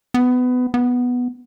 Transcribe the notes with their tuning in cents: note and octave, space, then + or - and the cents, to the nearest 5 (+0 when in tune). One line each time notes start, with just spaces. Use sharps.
B3 +20
B3 +0